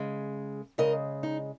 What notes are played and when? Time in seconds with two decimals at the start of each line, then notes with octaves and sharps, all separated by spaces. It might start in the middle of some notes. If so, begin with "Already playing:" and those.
Already playing: C#3 G#3
0.78 C#3 G#3 A#4 D#5
1.23 D#4